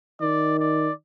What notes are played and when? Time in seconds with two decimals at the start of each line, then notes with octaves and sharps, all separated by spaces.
0.21 D#3 D5
0.59 D5